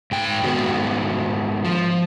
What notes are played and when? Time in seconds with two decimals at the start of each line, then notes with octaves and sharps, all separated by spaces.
0.11 G#2 G5
0.44 G#2 D#3 B3 F#4
1.64 F3